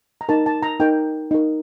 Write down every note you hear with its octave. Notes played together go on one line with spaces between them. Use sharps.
A#5
D#4 A#4 A5
A5
A#5
D#4 A#4 G5
D#4 A#4